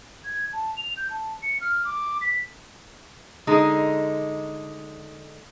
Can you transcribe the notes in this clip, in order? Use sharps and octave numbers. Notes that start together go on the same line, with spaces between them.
G#6
A5
F7
G6
A5
C#7
F6
D6
B6
D3 G#3 D#4